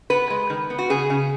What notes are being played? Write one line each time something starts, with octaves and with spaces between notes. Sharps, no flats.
B3 B4
G#3
D#3
B3
F#4
C#3 G#4
C#3